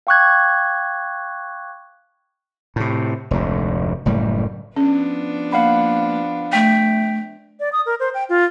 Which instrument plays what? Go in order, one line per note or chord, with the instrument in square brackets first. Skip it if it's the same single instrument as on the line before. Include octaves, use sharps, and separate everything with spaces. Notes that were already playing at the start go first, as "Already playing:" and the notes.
[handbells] F5 G5 C#6 D6 F#6 G#6
[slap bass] A2 C3
F1 D2 G#2
F#1 A2 G3
[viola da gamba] F3 B3 D4 [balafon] C#4
[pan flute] A#3 [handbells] F5 F#5 B5
[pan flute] A3 [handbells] G5 B6
[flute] D5
D#6
A#4
C5
G5
F4